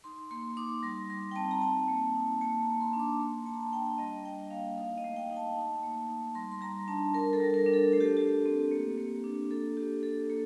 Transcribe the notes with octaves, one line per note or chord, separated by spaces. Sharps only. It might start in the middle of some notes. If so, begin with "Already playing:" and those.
D#4 C6
A#3 C6
D#4 D6
G3 C6
G3 C6
G5
C4 A5
A#5
D#4 A5
A#3
D#4
A#3 A5
A#5
A#3
C6
D4
D6
A#3 C6
A#3 A5
A#5
A5
D4 G5
G3 D#5
G3 G5
A#3 F5
D#4 F5
D#5
A3
G5
D#4
A5
D#4
A#3
D#4
G3 C6
C6
G3 A#5
D4 A5
G3 A#4
A4
G3
A#4
D4
A4
A3 A4
G4
A3 G4
C4
A#3
A#3
D4
A#3 A4
A#3 G4
D4 A4
A#3 A4